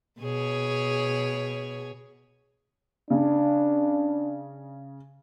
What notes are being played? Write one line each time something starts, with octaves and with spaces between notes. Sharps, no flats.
B2 G#4 C#5
C#3 D4